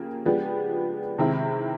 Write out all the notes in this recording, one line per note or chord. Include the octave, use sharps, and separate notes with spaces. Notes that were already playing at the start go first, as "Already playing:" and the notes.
Already playing: C#3 F3 A#3 G4
F3 G#3 B3 D4 G4
C3 D#3 G#3 C4 E4